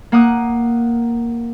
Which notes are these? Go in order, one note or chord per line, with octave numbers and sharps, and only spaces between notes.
A#3 F#5 D6 D#6 F#6